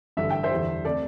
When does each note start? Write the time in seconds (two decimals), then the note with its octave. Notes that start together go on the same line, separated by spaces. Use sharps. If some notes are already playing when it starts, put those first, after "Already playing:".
0.17 A1 G2 D3 G3 E5
0.31 G5
0.43 C5 E5
0.51 E2 D3 G3
0.85 C3 A3 A4 D5